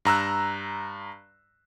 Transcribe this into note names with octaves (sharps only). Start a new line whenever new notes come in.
G2 A#5 E6 F#6